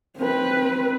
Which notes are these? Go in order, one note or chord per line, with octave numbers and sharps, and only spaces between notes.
C4 B4